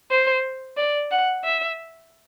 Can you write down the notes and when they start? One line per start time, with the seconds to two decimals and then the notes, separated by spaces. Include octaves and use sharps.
0.10 C5
0.77 D5
1.11 F#5
1.44 E5